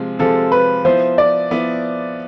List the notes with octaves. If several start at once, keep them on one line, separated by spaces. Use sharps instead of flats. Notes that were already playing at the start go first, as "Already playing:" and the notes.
Already playing: C3 F3 G#3
C3 F3 G#3 A4
B4
F3 B3 E4 C5
D5
F3 B3 E4